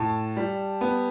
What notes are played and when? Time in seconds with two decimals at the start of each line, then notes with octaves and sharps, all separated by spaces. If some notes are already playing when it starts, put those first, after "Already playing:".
Already playing: A2 A5
0.37 G3
0.81 B3